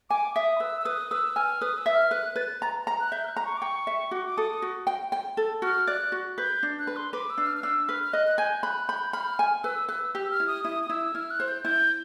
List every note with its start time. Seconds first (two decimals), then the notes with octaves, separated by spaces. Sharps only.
0.10 G#5 D6
0.35 E5 D#6
0.60 B4 E6
0.81 E6
0.85 B4 D#6
1.11 B4 E6
1.36 G#5 F6
1.61 B4 D#6
1.78 E6
1.86 E5
1.94 F6
2.11 B4 F#6
2.36 B4 A6
2.62 A#5
2.87 A#5
3.00 F#6
3.12 E5 G6
3.24 F6
3.28 F#6
3.37 A#5
3.44 C#6
3.57 D6
3.62 G5 C#6
3.87 E5
4.11 F#4 D6
4.27 D6
4.37 A4 D#6
4.62 F#4
4.87 G5
5.12 G5
5.37 A4
5.62 F#4 F6
5.87 D5 F#6
6.12 F#4
6.38 B4 G6
6.63 D4
6.79 F#6
6.87 B4
6.96 C6
7.13 B4 D6
7.30 E6
7.38 D4
7.46 F6
7.57 F6
7.63 D4 E6
7.88 B4 F6
8.03 F6
8.13 D#5 F#6
8.27 F#6
8.38 G#5 G6
8.63 B5 F#6
8.88 B5 G6
9.13 B5 F6
9.39 G#5
9.64 B4 E6
9.89 B4 E6
10.15 G4 E6
10.31 F6
10.40 E4
10.47 D#6
10.64 E4 D#6
10.84 D#6
10.90 E4 E6
11.15 E4 F6
11.31 F#6
11.40 C5
11.48 G6
11.65 E4 G6